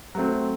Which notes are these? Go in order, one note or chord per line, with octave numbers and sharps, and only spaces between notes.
F#3 A3 C4